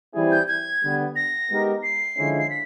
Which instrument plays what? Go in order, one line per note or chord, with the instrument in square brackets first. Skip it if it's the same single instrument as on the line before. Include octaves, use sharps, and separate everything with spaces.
[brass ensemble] E3 G3 C4 E4 G#4
[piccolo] G6
G#6
[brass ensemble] D3 G3 B3
[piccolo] A#6
[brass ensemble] G#3 B3 D#4 G4 A#4
[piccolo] C7
[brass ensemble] D3 F3 G#3 C#4 E4
[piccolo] C7
B6